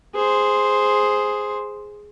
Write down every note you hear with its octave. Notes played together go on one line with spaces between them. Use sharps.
G#4 C5